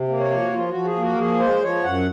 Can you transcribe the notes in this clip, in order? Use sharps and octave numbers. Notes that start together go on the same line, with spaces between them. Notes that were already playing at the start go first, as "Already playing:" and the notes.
Already playing: C3
A#3
C#5
F3
F#4
F3 F4
F3 F#4
G#4
A#3
F#4
A#4
F3 G#4
G#3 C5
F3 C#5
F#2 F#5